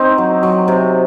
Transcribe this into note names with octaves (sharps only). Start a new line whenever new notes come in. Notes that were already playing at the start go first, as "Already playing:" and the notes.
Already playing: C4 D#4
F#3
F#3
C3